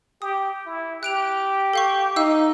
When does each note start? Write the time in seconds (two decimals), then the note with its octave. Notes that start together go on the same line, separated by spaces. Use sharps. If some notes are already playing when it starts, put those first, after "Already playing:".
0.22 G4 D#6
0.66 E4
1.03 G4 F#6 D7 F7
1.73 A4 F5 C#6
2.16 D#4 F5 E6